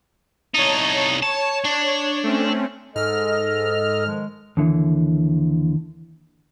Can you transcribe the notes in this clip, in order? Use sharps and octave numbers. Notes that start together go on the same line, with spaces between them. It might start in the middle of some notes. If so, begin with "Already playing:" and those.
C2 D#4 C#5 A5
C#5 A5
D4
A3 C4 C#4
G#2 A4 D#5 F6
D#3 F3 G#3
D#2 D3 E3